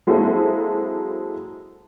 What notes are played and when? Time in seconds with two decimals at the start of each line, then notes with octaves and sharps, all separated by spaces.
0.07 F#3 G#3 A#3 C4 E4 A4